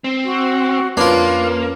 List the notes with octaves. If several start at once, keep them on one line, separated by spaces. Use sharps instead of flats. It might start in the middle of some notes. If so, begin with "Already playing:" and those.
C4
F#4
F2 A#3 C#4 D4 F4 A#4 B4